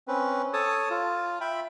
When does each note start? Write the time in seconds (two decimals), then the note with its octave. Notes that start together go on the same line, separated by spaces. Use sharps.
0.08 C4 C#4 B4
0.53 A4 C#5 A5 D#6
0.90 F4
1.41 E5 G5 B5